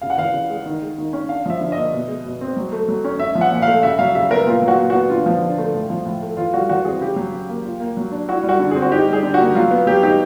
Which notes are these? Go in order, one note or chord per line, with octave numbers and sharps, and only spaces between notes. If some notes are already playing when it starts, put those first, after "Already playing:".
C#3 F5
F#5
E3 F5
C#3
G#3
D#3
G#3
D#3
C#4
D4 F5
F3 E5
D3
A#3 D#5
B2
G#3
B2
C4
F#3
A3
F#3
C#4
C#4 E5
F3
F#5
A#2
A3 F5
C#3 E5
F#3 F5
C#3 E5
B3 A#4
A#2 F4
F#3
F#4
A#2
B3 F#4
D3 F4
F3
D3
A3
A2
F3
A2
A3
E3 F4
G3 F#4
E3 F#4
C4 G#4
C#3 G4
F#3
C#3
A#3
F4
A#3
F#3
D4
E4 F#4
G3
F#4
D3
C4 G#4
F#4
D#4 G4
G3
G#4
D3
F#4
A#3
F#3 F4
B3
F#3 G4
D#4 G4